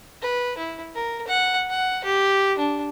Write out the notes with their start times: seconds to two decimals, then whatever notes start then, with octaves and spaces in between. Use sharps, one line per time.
0.22 B4
0.58 E4
0.95 A#4
1.28 F#5
1.70 F#5
2.04 G4
2.58 D4